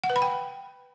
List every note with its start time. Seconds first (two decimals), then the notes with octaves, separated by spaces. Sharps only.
0.04 F#5
0.10 B4
0.16 B5
0.22 G5